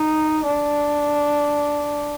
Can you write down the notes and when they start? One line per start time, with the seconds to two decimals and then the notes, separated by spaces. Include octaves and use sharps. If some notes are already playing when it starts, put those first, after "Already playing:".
Already playing: D#4
0.46 D4